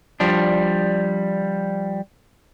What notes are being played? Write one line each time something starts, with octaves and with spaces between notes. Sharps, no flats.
F3 G3 D4